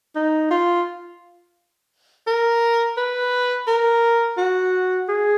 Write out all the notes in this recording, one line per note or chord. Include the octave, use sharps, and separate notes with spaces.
D#4
F4
A#4
B4
A#4
F#4
G#4